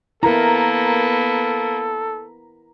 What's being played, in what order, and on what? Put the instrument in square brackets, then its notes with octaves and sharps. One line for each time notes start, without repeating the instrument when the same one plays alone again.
[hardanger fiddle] A#3 B3 [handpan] E4 A#4 [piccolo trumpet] A4 [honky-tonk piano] A#5